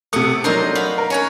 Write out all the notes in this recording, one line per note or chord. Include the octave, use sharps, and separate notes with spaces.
C3 A3 F#5 D#6
F#3 D4 D#4 A#4 C5
F#4 F5 B5
A#4
C#4 C#5 F#5